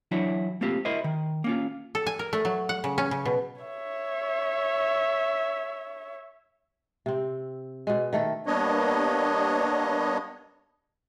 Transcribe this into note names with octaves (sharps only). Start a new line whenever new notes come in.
E3 F#3 D4 E4 F#4 C#5
A3 A#3 C4 F4 G4
E4 F#4 A#4 C5 D#5
D#3
A#3 C#4 F4
A4
G#5
A#4
A3
F#3
F#5
C#3
C#4
C#3
B2
C#5 E5
C3 C4
B2 G#3
D#3 A3 A4
G3 A#3 B3 D4 C#5 D#5